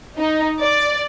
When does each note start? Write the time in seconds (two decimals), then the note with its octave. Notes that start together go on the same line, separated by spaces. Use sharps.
0.19 D#4
0.60 D5